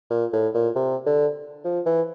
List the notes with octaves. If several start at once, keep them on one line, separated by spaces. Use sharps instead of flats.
A#2
A2
A#2
C3
D3
F3
E3